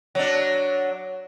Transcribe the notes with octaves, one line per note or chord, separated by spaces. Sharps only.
F#3 D4